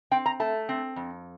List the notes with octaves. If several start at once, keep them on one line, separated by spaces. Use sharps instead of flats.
C4 G5
A#5
A3 A5
C4
F2